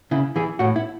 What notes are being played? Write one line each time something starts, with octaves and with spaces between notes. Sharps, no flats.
C#3 E4
E3 G#4
A2 F#4
E4